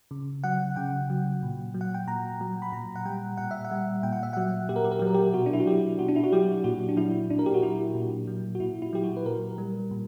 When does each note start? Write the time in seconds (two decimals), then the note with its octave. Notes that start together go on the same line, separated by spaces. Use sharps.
0.11 C#3
0.44 F#3 F#5
0.76 C#3 G5
1.10 F#3
1.43 A#2
1.74 F#3
1.81 F#5
1.94 G5
2.07 A#2 A#5
2.41 F#3
2.62 B5
2.72 A#2 A#5
2.96 F#5
3.05 G3 G5
3.37 A#2 F#5
3.51 E5
3.65 F#5
3.71 G3
4.03 A#2 G5
4.13 F#5
4.23 E5
4.33 F#3 F#5
4.69 A#2 G4
4.76 A#4
4.84 G4
4.92 A#4
4.99 F#3 G4
5.07 A#4
5.14 G4
5.34 B2 F#4
5.46 D4
5.53 E4
5.60 F#4
5.66 F#3 G4
5.99 B2 F#4
6.08 D4
6.16 E4
6.23 F#4
6.32 F#3 G4
6.64 A#2 F#4
6.89 D4
6.97 F#3 E4
7.30 A#2 D4
7.39 A#4
7.46 G4
7.54 F#4
7.62 F#3 E4
7.95 A#2
8.27 F#3
8.55 F#4
8.60 A#2 E4
8.82 E4
8.93 F#3 G4
9.04 F#4
9.17 B4
9.25 A#2 A#4
9.58 G3
9.91 A#2